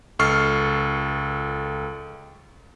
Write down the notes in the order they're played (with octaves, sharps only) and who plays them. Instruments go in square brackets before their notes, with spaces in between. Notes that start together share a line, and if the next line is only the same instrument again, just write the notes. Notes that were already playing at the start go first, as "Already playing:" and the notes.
[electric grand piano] C#2 A4 C#6 F6 C7